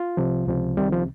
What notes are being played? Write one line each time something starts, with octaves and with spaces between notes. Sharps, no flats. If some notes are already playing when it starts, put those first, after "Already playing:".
Already playing: F4
C2 C3 F3
C#2 C3 F3
C2 C3 D#3 G3
F3